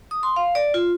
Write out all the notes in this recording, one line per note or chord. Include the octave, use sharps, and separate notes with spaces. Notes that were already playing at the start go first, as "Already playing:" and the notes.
D#6
C6
F5
D5
F4